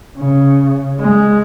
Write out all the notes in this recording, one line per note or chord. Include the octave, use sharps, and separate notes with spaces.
C#3
G#3